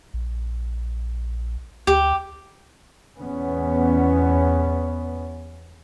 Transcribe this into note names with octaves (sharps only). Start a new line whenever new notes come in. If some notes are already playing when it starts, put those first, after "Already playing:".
A#1
D2 G4
E2 B3 C#4